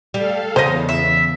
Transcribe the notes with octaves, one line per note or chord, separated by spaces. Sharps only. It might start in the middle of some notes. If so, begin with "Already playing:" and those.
G3 A4 F5
E2 C#3 C5 D#5
E5